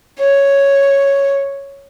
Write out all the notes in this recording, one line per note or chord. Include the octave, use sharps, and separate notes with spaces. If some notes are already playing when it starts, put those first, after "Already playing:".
C#5